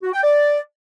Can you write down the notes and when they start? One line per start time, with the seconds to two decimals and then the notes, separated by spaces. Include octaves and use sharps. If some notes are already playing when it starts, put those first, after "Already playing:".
0.03 F#4
0.13 G5
0.23 D5